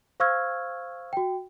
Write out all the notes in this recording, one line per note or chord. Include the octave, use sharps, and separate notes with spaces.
C5 F5 C#6 E6 F6 G#6
F#4 G5